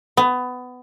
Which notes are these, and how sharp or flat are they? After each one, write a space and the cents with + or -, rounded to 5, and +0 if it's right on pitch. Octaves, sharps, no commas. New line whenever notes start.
B3 +20